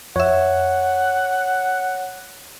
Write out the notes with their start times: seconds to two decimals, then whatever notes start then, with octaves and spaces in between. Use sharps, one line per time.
0.16 F2 C#5 E5 F#5